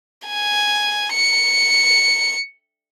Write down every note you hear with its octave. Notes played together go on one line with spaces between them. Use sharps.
G#5
C#7